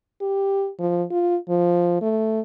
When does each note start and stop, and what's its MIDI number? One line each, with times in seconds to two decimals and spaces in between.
0.21 0.70 67
0.80 1.04 53
1.11 1.36 65
1.49 1.98 53
2.02 2.41 57